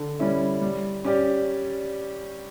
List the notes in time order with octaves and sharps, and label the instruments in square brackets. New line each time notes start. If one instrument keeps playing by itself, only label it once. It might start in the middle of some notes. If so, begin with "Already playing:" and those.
Already playing: [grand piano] D3
G3 C#4 E4
G3
C#4 G4 D5